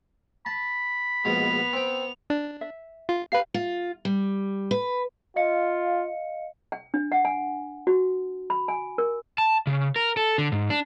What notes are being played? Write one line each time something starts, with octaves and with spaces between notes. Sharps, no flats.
A5 B5
A#1 B2 G#3 B3 F7
C4 G5
D4
E5
F4
G4 B4 F5 C7
F4
G3
B4
F4 D#5 F5 C#7
G5
D4
F#5
G#5
F#4
B5
G#5
A#4
A5
C#3
A#4
A4
D3
G#2
D4